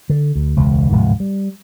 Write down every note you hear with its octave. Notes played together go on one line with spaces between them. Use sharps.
D3
D2
E1 C#2
D1 G#2 C3 F3
G3